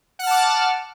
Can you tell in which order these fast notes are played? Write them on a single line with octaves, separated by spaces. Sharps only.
F#5 F6 A5 D6